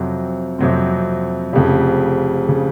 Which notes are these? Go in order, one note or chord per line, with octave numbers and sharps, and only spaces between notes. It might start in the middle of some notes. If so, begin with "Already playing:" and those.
Already playing: F2 C3 F#3 C4
F2 C3 F#3 C4
F1 F2 C#3
C#3